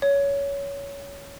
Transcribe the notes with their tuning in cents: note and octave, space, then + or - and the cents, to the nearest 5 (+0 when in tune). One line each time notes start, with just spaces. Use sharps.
C#5 +15